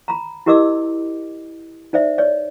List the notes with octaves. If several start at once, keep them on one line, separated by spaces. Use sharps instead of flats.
A#5 B5
E4 G4 A#4 D#5 D6 E6
D#4 C5 D5 E5
C#5 D5